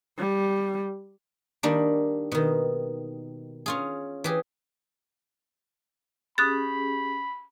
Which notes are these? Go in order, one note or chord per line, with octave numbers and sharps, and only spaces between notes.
G3
D#3 G3 A#3 D4
B2 D#3
C#4 F4 G#4
E3 G4 G#4
C#4 G4 G#4 B5 D#6 F#6 A6